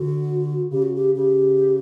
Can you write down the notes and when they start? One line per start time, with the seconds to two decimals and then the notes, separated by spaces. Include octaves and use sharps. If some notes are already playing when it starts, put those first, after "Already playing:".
Already playing: D3 F#4
0.71 C#3 G4
0.82 F#4
0.95 G4
1.14 C#3 G4